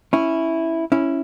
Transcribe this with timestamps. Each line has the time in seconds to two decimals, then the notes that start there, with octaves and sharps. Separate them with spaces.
0.13 C#4 E4
0.92 C#4 E4